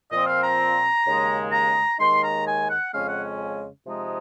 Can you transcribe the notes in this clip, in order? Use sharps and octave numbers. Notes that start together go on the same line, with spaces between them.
A#2 F3 C4 D#5
F5
A#5
D#2 C#3 G#3
A#5
D#2 D#3 G#3 D#4 C6
A#5
G#5
F#5
F2 C#3 G#3 C#4 F5
F#5
C3 F3 G#3 D#4